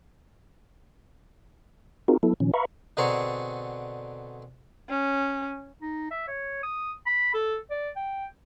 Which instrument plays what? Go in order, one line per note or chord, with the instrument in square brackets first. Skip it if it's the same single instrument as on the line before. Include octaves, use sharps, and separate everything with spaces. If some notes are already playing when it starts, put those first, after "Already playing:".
[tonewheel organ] C4 D#4 F4 F#4 G#4 A#4
F#3 B3 E4 A4
A#2 D#3 F3 C#4
B4 E5 F5 A#5 B5 C#6
[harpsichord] B2 D3 C4 G#4 A#5 C#6
[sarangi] C#4
[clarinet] D#4
E5
C#5
D#6
B5
A4
D5
G5